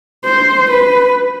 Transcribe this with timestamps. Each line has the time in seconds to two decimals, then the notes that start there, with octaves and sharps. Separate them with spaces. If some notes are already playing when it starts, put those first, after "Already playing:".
0.25 C5
0.71 B4